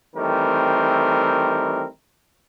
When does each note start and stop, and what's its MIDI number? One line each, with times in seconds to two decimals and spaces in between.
0.15 1.86 51
0.15 1.86 52
0.15 1.86 55
0.15 1.86 57
0.15 1.86 60
0.15 1.86 70